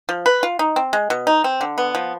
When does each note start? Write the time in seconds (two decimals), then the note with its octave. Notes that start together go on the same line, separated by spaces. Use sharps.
0.09 F3
0.26 B4
0.43 F4
0.59 D#4
0.76 C4
0.93 G#3
1.10 B2
1.27 D#4
1.44 C4
1.61 D3
1.78 B3
1.95 F3